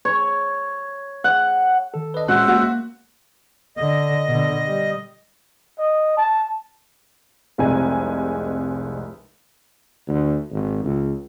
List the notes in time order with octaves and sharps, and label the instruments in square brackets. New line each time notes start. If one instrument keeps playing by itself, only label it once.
[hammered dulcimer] C#5
F#5
[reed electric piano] D#3 A4
[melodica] D4 [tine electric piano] B4 D#5
[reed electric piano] A#2 [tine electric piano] G#3 C#4 [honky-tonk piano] F#4 F#6 [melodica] C5 E5 F#5
[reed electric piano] A#3 [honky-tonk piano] F#4
[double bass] D3 [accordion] D#5
[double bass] B2 D3
G3
[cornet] D#5
A5
[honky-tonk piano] F1 C2 G#3 C4 G#5
[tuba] D2
G#1
C#2